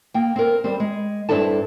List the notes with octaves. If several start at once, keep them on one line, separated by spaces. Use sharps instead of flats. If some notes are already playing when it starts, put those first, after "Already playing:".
A#3 G5
C4 A#4
G3 C4
G#3
G2 C4 D4 E4 A4 A5